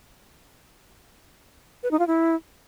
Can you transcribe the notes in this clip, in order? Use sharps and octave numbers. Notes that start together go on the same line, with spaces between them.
B4
D#4
F4
E4